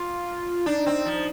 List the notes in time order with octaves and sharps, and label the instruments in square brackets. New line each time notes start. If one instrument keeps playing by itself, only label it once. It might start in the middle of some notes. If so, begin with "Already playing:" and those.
Already playing: [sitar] A#3 [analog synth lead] F4
[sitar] D4 [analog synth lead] D#4
[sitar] C4
F3